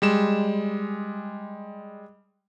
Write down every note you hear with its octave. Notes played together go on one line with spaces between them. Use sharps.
G3 G#3 E7